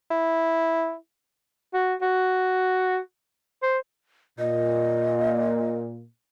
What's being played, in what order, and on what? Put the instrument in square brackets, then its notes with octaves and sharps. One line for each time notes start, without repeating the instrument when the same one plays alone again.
[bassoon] E4
[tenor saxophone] F#4
F#4
C5
[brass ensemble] A#2 [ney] D#5